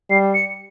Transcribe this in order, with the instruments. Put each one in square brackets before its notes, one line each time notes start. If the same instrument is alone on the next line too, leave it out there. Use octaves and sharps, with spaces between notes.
[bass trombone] G3 [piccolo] C7
[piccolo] C#7